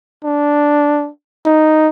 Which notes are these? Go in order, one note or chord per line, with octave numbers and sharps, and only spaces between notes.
D4
D#4